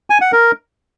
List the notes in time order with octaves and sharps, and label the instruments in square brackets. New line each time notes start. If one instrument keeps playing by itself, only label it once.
[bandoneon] G#5
F#5
A#4